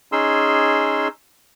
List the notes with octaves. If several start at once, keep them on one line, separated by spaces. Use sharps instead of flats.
C#4 D#4 G#4 C6 E6